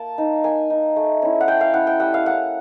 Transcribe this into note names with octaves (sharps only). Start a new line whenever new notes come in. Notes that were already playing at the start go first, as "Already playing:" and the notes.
Already playing: A#3 A5
D#4
A#3 G#5
D#4
A3
C#4 E4
F#5
A3 G5
F5
C#4 E4 F#5
G5
G3 F#5
F5
A#3 C#4 F#5